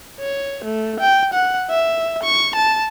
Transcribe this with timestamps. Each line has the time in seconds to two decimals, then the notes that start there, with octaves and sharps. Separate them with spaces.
0.20 C#5
0.65 A3
1.00 G5
1.34 F#5
1.70 E5
2.23 C#6
2.56 A5